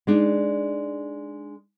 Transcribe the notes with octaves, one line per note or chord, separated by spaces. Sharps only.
G#3 D4 D#4